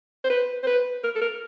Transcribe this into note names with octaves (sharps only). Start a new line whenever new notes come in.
C5
B4
C5
B4
A#4
A4
A#4